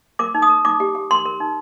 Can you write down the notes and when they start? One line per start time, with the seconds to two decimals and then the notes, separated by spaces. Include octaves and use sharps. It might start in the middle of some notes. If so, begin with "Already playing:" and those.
0.19 A#4 D6
0.35 D#4
0.42 D#6
0.49 A#4
0.65 D#4 D6
0.80 G4
0.95 G4
1.11 A#4 C6
1.26 A#4
1.40 D#4